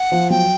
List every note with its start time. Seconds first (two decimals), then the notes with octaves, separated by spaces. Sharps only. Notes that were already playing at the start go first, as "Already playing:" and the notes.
Already playing: F#5
0.12 F3
0.30 F#3 G5